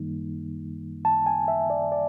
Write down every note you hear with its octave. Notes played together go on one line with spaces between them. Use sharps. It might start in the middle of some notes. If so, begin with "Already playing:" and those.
Already playing: F#2 D#3 G3 A#3 D#4
A5
G#5
E5
D5
D5